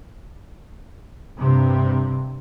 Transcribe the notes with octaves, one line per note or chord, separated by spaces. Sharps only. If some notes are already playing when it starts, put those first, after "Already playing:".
G2 C3